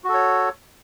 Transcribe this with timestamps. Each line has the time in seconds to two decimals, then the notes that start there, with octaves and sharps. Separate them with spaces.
0.04 F#4
0.09 A4
0.14 C#5